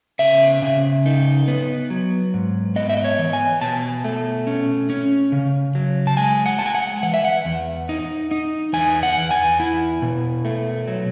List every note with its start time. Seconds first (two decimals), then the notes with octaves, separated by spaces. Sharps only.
0.19 C#3 E5
0.62 C#3
1.06 D#4
1.48 B3
1.90 F#3
2.34 G#2
2.76 B3 D#5
2.89 E5
2.97 D#5
3.04 C#5
3.19 E3
3.33 G#5
3.61 B2 A5
4.04 A3
4.47 C#4
4.90 C#4
5.32 C#3
5.75 F#3
6.07 A5
6.17 G#3 G#5
6.46 F#5
6.59 G#3 A5
6.66 G#5
6.75 F#5
7.03 E3 F#5
7.14 E5
7.25 F#5
7.45 E2
7.89 D#4
8.31 D#4
8.73 E2 G#5
9.03 F#5
9.17 E2
9.31 G#5
9.60 E4
10.02 B2
10.45 A3
10.88 F#3